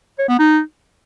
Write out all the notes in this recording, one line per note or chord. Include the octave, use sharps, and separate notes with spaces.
C#5
B3
D#4